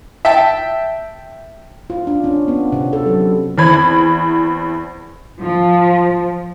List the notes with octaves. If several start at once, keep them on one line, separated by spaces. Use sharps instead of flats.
E5 G5 A5
F4
D4
C#4
B3
C3
A4
F#3
E2 E3 C4 B5 G#6
F3